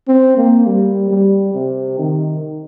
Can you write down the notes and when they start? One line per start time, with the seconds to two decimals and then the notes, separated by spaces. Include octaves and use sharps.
0.08 C4
0.37 A#3
0.66 G3
1.10 G3
1.54 C3
1.99 D#3